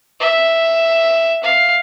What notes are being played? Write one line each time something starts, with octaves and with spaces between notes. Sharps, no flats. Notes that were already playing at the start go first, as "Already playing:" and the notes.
E5
F5